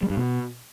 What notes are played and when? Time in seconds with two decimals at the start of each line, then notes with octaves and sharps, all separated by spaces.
0.03 G3
0.10 G2
0.17 B2